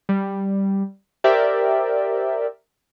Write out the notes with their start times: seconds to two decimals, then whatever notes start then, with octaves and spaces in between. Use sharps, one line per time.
0.09 G3
1.24 G4 A#4 C5 D5 E5 G5